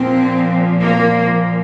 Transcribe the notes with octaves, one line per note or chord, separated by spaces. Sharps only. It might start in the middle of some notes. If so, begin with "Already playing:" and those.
Already playing: A#2 F3 C4
A#3
A#2 F3